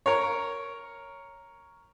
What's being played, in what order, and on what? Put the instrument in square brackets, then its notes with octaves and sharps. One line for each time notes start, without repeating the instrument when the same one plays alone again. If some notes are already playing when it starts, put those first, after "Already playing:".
[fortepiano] A#4 C#5